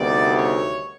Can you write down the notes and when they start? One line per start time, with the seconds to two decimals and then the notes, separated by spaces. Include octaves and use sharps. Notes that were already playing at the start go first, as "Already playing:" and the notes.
Already playing: D2 C3 D#3 G3 B3 D5
0.36 C#5